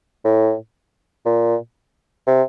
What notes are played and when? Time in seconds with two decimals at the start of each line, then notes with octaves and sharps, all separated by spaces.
0.25 A2
1.26 A#2
2.27 C3